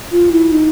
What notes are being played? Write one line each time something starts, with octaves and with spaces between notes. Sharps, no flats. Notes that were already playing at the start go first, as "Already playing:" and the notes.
F4
E4
D#4